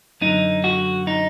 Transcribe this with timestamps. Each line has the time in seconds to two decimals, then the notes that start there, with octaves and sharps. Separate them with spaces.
0.21 F#2 D3 D#4
0.64 F#4
1.07 D#4